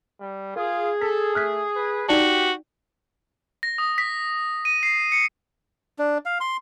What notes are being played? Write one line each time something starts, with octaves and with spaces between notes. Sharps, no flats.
G3
F4 G#4 A#4
A4 B6
A3 F6 F#6 B6
B4
D#4 F#4 G4 D5 A5
A#6
D#6
B6
D#7
C7
C#7
D4
F5
C6